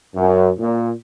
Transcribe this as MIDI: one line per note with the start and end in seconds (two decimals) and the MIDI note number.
0.16 0.50 42
0.58 0.92 46